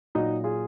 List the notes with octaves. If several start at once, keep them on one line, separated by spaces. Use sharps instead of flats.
A#2 F#3 D#4 F#4
F4 G#4